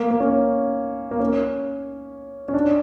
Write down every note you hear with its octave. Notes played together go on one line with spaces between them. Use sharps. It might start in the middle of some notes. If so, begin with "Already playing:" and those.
Already playing: A#3
A#3
C#4
A#3
C#4
C#4
D4